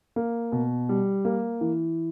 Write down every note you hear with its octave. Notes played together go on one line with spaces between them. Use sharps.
A#3
B2
G3
A#3
E3